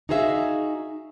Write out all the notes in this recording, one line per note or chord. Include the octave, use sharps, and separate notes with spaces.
D#4 F#4 G#4 C5 E5 F5